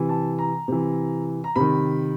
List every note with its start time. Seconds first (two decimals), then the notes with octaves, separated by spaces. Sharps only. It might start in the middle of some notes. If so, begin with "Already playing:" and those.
Already playing: C3 E3
0.09 A5
0.39 A#5
0.68 C3 E3
1.44 A#5
1.56 C3 D#3 B5